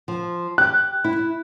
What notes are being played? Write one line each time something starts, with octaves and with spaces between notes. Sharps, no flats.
F3
G4 F#6
E4